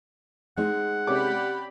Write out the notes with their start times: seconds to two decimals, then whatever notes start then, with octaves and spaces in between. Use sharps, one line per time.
0.57 G#3 C4 D#4 F#5
1.07 C3 C#4 G4 D5 B5 D6